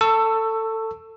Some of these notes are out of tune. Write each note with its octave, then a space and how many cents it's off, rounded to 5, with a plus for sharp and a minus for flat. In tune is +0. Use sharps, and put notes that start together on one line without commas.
A4 +20 C#6 +0 E6 +10